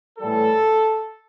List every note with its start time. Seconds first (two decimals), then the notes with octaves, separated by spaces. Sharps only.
0.19 A2 E3 G3 A4